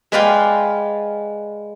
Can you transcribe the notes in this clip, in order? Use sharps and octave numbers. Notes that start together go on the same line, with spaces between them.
G#3 B4 D5 F5 G5